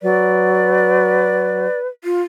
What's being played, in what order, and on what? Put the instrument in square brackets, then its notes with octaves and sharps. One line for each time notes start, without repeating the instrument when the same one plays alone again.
[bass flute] F#3 [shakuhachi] B4 [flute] D5
[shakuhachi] F4